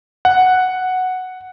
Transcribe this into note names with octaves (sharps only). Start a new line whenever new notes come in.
F#5